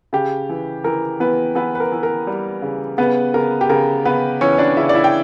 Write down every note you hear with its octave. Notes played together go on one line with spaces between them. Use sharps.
C#3 G4
E3
E3 A#4
E3 B3 B4
E3 B3 B4
B4
A#4
E3
A#4
G3
C#3
C#3 B3 B4
C#3 A#4
G4
C#3 A#4
C#3 B3 B4
E3 C#4 C#5
D4 D5
C#3 E4 E5
D5
E4 E5
G5